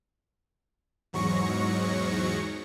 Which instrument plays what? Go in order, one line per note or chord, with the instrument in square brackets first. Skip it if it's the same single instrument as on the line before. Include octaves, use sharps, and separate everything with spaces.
[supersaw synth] E2 G#2 F#3 C#6 A#6 C#7